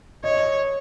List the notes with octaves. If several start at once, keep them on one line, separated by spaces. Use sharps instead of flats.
C#5 D#5